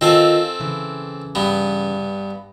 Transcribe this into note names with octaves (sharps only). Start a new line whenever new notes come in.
D#3 C4 F4 A4 D#5 G#5
C#3 E3
G2 B3